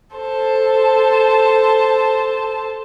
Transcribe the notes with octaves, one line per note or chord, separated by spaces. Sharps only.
A4 C5 A5